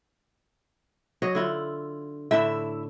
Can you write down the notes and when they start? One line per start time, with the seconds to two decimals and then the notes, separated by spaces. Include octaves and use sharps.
1.22 F#3 C#5 D#5
1.35 D3 E4 F4
2.31 A2 D3 E4 E5